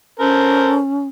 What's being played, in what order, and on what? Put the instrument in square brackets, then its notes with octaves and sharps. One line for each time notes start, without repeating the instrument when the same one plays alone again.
[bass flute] C#4 [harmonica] A4 A#4 C5